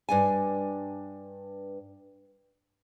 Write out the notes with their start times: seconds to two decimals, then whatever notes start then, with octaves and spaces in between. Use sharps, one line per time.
0.09 G2 D4 G#5